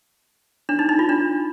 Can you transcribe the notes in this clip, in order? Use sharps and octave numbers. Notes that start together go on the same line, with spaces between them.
D4
D#4
D#4
F4
D4